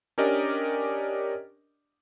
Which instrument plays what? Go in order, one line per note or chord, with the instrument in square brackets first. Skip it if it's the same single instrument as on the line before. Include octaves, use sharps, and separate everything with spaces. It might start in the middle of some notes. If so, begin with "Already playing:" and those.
[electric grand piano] C#4 D4 G4 A#4 D5 D#5